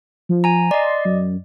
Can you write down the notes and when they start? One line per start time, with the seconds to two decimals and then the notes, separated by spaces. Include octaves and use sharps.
0.29 F3
0.44 G#5 A#5
0.71 D5 D#5 C6
1.05 F#2